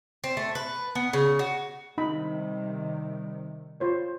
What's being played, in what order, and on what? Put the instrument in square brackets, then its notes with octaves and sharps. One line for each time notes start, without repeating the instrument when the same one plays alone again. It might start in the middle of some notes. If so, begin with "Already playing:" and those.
[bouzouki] C4
A3
B4
B3
C#3
F#4
[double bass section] C3 D#3 G3 [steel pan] D#4 B5
[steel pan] F4 C5 C#5